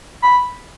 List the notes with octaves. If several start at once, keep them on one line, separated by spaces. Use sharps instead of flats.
B5